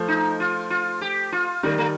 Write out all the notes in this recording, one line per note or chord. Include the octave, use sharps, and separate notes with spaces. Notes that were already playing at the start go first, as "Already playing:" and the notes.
Already playing: F3 A3
D#4
F4
F4
G4
F4
D#3 G3 A3
A3